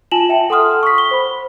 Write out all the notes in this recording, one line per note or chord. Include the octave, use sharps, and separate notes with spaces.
F4 G#5 A5 E7 F#7
E5 G5 A5
A4 F#5 C6 D#6 F6
C#6 B6
G7
C5 B5